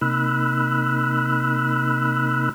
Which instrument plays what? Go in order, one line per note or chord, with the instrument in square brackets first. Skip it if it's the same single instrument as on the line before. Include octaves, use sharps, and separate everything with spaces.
[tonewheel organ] C3 A#3 D#4 B5 E6 F#6